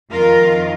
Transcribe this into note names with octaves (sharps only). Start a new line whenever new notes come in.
F2 D#3 F4 A#4